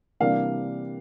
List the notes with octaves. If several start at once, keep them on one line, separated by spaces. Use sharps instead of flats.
C3 E3 G3 A#3 D4 F5